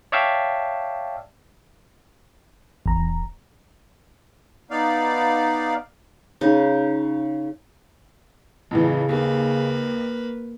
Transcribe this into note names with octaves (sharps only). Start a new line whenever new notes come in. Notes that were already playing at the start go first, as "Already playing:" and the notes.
C#5 D5 E5 F5 G5 A5
G#1 E2 A#5
D1
B3 D#4 D5 F5
C#3 D#4
F2 A2 C#3 E3
D#2 A#3 B4